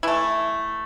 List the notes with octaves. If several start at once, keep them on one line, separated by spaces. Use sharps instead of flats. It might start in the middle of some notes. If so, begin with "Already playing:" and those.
E3 A3 E4